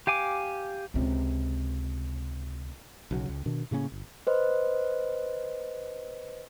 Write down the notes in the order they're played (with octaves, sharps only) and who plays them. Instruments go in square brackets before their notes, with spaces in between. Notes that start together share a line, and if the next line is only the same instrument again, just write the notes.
[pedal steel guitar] G4 F5 G#5 D6
[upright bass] C#2 C3
[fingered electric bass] B1 C#3 F#3
C#2
B2 D#3 D4
A2 C#3 A#3 C#4
G1
[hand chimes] B4 C5 D#5